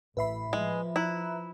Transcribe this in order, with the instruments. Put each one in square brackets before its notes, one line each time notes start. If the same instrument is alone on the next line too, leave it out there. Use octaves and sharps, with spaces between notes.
[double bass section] A1 [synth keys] A2 C7 [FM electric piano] B4 E5 B5
[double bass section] F3 [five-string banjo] G#3
[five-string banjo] E4 [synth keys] A#5 F#6